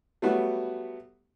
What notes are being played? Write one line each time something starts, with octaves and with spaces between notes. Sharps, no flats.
F#3 G3 A3 B3 F#4